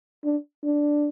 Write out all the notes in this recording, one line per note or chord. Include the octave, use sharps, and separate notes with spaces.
D4
D4